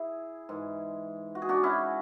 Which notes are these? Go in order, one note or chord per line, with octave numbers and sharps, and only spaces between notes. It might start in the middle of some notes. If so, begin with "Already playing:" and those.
Already playing: E4 G#4
G#2 E3
F#4
G#4
D4 F#4
C#4 E4